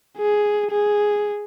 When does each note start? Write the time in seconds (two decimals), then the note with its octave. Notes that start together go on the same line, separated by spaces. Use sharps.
0.18 G#4
0.71 G#4